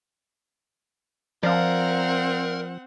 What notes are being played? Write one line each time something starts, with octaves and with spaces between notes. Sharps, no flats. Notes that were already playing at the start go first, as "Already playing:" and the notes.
F3 C4 A#4 D5 F5 F#5